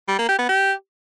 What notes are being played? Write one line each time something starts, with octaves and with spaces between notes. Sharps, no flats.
G3
A#3
G4
B3
G4